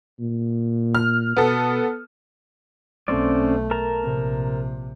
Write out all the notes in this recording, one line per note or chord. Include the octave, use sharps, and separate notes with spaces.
A#2
F6
B2 B3 A4
B1 A3 C4 C#4 D5
A#4 A5 A#5
A#1 C3